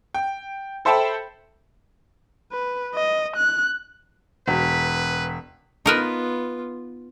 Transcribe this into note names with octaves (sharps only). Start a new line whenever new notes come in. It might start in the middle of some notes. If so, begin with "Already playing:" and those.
G5
A4 C5 E5 G5 A5 B5
B4
D#5
F#6
E1 B4
B3 D#4 F4 A#4 B4